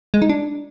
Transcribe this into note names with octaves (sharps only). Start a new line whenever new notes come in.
G#3
D#4
D4